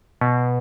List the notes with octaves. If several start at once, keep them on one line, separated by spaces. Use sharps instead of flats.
B2